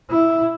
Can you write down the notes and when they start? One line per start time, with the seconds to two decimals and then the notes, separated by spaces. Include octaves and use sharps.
0.10 E4